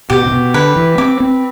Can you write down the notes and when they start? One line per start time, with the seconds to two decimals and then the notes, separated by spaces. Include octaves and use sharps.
0.10 B2 G4
0.26 C3
0.31 B2
0.54 D3 B4
0.76 E3
0.98 C4 D6
1.20 C4